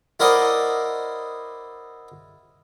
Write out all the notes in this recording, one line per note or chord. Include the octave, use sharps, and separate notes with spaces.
E4 A#4 C5 D5 D#5 F#5